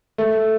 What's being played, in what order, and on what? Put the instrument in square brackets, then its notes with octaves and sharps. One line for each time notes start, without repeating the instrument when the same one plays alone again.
[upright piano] A3